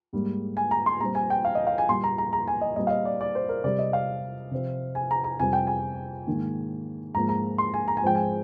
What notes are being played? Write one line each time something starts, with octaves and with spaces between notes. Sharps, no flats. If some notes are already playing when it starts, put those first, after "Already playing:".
G#2 G3 A#3
G#5
A#5
C6
A#2 G3 C4 A#5
G#5
G5
F5
D#5
F5
G#5
A#2 G3 A#3 C6
A#5
A#5
A#5
G#5
D#5
A#2 G3 C4 D#5
F5
D#5
D5
D5
C5
A#4
C3 G3 C4 D5
D#5
F5
C3 F3 C4
G#5
A#5
A#5
F2 C3 G3 C4 G#5
G5
G#5
G#2 D#3 A#3
G#2 F3 A#3 A#5
A#5
C6
G#5
A#5
G#5
G#2 F3 G#3 C4 G5
G#5